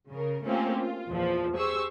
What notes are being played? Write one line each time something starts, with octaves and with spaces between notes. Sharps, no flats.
C#3 A#4
A3 A#3 C4 C#4 F4 G4
F4
E2 A#2 F3
G4 G#4 C5 C#6 E6